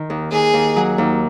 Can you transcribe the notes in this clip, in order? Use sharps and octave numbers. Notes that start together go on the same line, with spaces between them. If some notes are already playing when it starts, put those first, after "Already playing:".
Already playing: D#3
D#2
D#2 G#4
D#2
F#3
D#2